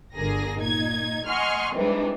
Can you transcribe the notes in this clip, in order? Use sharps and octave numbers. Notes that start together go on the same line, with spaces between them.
G1 D3 G#4 A#4 A#6
A#2 D#4 G#6
D#5 F#5 G#5 C6 C#6 F6
C3 D#3 E3 G3 G#3 D4